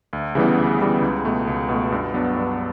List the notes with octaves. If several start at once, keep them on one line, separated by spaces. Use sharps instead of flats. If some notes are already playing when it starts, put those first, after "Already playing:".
D2
C#3 E3 G3 B3
D2
C#3 E3 G3 B3
C#2
B2 A3
C#2
B2 A3
G2
F#3 B3 D4
G2